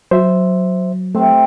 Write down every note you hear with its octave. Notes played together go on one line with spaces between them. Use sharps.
F#3 C5 E5
C3 A3 C4